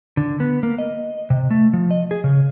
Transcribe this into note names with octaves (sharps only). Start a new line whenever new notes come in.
D3
B3
A#3
D#5
C3
A3
F3
D#5
G#4
C#3